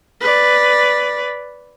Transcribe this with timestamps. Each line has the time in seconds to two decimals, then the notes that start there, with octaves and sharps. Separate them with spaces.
0.21 B4 D5